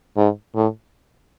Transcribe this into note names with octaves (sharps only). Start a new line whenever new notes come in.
G#2
A2